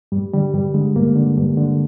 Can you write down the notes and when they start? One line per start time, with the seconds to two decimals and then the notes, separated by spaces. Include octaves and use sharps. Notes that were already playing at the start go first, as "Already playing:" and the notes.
0.12 G2 G3
0.34 D3 G3
0.53 G2 G3
0.74 D3 G#3
0.96 G2 A#3
1.16 D3
1.37 G2
1.57 D3